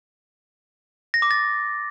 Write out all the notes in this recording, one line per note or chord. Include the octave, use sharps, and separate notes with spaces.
A#6
D6
A6